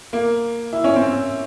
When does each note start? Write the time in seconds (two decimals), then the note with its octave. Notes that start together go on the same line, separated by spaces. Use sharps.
0.13 A#3
0.73 E4
0.84 C#4
0.96 C4